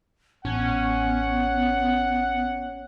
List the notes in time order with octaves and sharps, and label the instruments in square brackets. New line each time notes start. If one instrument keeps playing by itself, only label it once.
[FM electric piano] A1 G#6 [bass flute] B3 [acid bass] C#4 [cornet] F#5